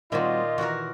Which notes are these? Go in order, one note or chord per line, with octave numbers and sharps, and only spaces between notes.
A#2 D#3 G3 C4 F4 F#4 D#5
D#3 E3 F#4 A#4